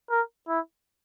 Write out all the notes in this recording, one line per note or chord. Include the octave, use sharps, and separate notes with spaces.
A#4
E4